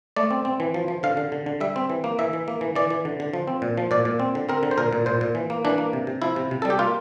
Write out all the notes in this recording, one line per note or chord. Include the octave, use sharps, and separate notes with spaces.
A3 D5
C4
C4
E3
F3
F3
D3 F5
D3
D3
D3
G3 E5
C4
E3
A#3
E3 E5
E3
A#3
E3
E3 D5
E3
D3
D3
F3
C4
A#2
F3
A#2 D5
A#2
C4
D3
C4 A#4
D3
C5
A#2 A#4
A#2
A#2 C5
A#2
E3
A#3
E3 D4
A#3
C3
C3
F3 E4
C3
C3
G3 A4
G4
A#3 F4